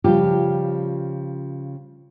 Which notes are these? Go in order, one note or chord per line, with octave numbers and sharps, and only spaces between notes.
C#3 F3 G3 F4 G4